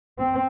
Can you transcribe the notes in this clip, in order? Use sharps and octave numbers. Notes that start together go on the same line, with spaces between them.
C4